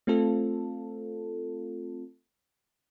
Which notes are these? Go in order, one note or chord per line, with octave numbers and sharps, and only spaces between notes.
A3 C4 F4 A4